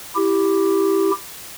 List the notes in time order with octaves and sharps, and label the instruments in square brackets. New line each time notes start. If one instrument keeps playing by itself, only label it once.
[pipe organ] E4 G4